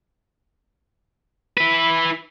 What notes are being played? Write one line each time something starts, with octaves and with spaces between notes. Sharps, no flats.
E4 B4